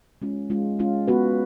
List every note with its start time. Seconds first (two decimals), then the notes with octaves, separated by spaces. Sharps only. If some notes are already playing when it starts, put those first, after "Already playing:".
0.22 G#3 C#4 F4
0.50 G#3 C#4 F4
0.79 G#3 C#4 F4
1.08 B3 F#4 B4